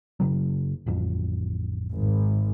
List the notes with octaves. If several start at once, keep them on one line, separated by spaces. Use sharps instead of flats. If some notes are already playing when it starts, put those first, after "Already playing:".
F#1 C#3 F#3
A1 F2
G#1